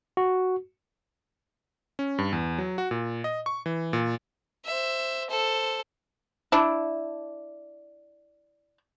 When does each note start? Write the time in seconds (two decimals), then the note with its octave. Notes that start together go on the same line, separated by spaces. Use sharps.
0.17 F#4
1.99 C#4
2.18 G2
2.33 E2
2.58 F#3
2.78 F#4
2.91 A#2
3.24 D#5
3.46 C#6
3.66 E3
3.93 A#2
4.66 C5 E5
5.30 A4 C5
6.52 D4 E4